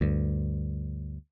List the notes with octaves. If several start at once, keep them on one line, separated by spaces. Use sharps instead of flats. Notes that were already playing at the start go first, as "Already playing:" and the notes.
D2 G2